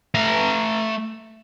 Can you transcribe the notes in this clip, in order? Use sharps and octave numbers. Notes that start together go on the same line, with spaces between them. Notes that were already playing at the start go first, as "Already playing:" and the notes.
A3 A#5